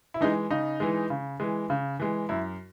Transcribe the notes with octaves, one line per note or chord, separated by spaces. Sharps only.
E4
E3 G#3 D#4
C#3 D#4
E3 G#3
C#3
E3 G#3
C#3
E3 G#3
F#2 E4